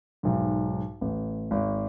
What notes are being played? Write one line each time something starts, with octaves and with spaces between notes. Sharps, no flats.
B1 G#2
A1
G#1